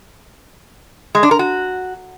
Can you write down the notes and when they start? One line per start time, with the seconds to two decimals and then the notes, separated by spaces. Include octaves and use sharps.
1.15 G#3
1.23 D4
1.31 A#4
1.39 F#4